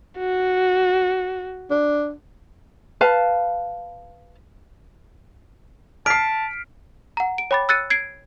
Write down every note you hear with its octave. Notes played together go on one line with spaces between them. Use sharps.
F#4
D4
B4 F5 A5
A5 F6 B6 C7 D7
F#5 A#5
D7
C#5 G5 B5 D6 A6
E6 F#6 A6 C#7 D#7
G#6 C7 D7